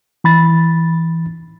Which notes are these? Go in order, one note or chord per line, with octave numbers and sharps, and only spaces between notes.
E3 B5 A6